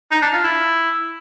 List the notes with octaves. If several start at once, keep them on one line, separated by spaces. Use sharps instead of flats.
D#4
D4
F4
E4